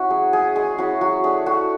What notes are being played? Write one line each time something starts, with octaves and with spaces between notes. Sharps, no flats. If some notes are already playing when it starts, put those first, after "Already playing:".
Already playing: C#4 E4 F#4
F#3 G#4
C#4 E4 G#4
G#3 G#4
C#4 E4 F#4
F#3 F#4
A3 D4 G#4
A3 F#4